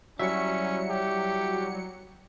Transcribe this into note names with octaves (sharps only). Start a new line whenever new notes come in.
F#3 G3 C#4 E4 C#5 E5 C#7
G4